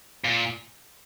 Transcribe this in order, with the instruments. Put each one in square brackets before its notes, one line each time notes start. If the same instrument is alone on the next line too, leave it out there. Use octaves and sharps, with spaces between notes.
[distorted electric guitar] A#2